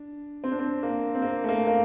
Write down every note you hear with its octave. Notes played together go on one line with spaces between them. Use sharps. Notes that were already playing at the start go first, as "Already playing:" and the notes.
Already playing: D4
C4
D4
C4
A#3
C4
A#3
A3
A#3
A#3